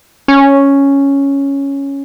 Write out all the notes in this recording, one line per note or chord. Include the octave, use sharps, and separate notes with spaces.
C#4